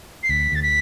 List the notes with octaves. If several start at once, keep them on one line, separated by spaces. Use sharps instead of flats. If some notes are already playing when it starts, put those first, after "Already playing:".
C7
D2 B6
D2 A6
B6